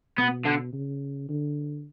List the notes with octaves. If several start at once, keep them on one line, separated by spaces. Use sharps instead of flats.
B2 B3
D3
C#3
D3